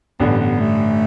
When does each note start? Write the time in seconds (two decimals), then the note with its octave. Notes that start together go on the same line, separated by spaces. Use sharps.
0.20 A1 G2 D3 B3
0.40 B3
0.60 A3